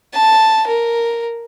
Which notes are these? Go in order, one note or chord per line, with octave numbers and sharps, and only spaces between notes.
A5
A#4